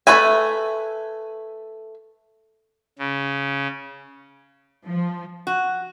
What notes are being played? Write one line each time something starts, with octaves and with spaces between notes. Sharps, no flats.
A3 B4 E5 G#5
C#3
F3
F#4